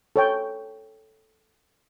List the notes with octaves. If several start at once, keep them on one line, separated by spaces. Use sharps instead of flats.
A4 C#5 G5